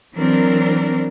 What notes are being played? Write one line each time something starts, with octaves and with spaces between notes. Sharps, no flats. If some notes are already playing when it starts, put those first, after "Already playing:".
E3 F#3 C4 D4 A#4